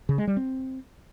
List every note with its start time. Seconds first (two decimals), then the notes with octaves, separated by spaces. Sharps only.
0.09 C#3
0.18 G#3
0.27 G3
0.37 C4